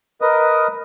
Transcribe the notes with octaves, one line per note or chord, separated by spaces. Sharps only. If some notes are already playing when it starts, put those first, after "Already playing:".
A#4 B4 D#5 D#6